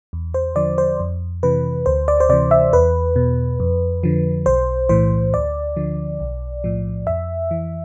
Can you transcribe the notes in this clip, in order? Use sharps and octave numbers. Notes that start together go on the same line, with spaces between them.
E2
C5
D3 F3 D5
C5
F2
C3 E3 B4
D2 C5
D5
C5
C3 E3 D5
E5
E2 B4
B2
F2
D3 F3
B1 C5
A2 E3 C5
D2 D5
D3 F3
B1
A2 F3
F2 E5
E3